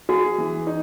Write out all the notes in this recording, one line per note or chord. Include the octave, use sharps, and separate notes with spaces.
F#4 G#4
E3
D#4